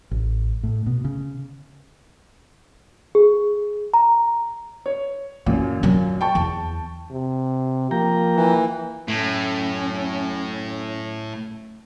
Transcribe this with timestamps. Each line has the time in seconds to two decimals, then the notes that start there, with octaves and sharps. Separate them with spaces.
0.11 A1
0.63 A2
0.86 B2
1.05 C#3
3.15 G#4
3.94 A#5
4.86 C#5
5.46 F#2 A#2 E3
5.83 F#3 A#3
6.21 G5 A5 C#6
6.35 E2
7.11 C3
7.91 F3 A#3 G5 A#5
8.36 E3
9.08 F#2 A2 C#4